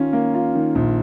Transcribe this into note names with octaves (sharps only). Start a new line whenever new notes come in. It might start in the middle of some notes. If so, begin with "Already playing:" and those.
Already playing: D#3 C#4 F4
A#3
F4
D#3
A#1